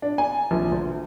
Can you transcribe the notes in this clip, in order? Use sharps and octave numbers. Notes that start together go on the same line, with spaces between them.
D4
G#5
A#1
D2